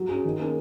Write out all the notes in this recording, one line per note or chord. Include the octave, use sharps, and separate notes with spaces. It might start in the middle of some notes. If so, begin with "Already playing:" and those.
Already playing: F#3
C#4 G#4
D#3
A#3 C#4 G#4